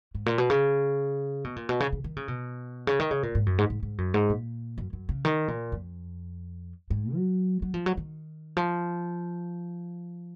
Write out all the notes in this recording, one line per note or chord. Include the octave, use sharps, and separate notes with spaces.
G#2
A#2
B2
C#3
B2
A#2
B2
C#3
C#3
D#3
C#3
B2
C#3
D#3
C#3
A#2
G#2
F#2
G#2
G#2
G#2
F#2
G#2
A#2
F#2
F#2
C#3
D#3
A#2
F2
G#2
F#3
F#3
F3
F#3
D#3
F3